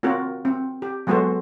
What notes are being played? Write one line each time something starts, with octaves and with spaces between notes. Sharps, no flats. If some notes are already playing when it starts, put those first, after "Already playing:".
A#3 C4 F4 F#4 A#4
C4
G4
F#3 G#3 B3 F#4 A4 C5